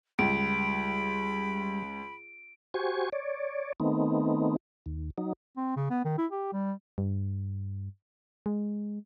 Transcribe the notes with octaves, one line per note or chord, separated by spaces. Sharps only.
C#2 G3 B5 D7
F#4 G4 C5 G#5 C#6
C#5 D5
D#3 A3 B3 C4 D#4
D#2
F#3 D#4
C4
C#3
B3
D#3
E4
G4
G3
G2
G#3